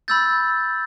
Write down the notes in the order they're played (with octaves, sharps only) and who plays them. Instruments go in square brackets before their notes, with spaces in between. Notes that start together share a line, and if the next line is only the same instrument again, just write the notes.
[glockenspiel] B5 E6 G6 A6